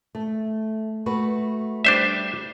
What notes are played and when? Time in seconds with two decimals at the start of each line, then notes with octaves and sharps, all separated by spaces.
0.15 A3
1.06 A3 F#4 B4
1.85 G3 D4 C5 E5